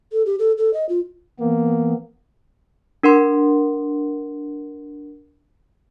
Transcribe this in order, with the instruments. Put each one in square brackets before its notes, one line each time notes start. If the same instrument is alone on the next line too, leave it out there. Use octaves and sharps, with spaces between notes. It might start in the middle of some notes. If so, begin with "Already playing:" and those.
[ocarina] A4
G4
A4
A4
D#5
F4
[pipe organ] E3 B3 [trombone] A#3
[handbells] D4 A#4 F#5 C6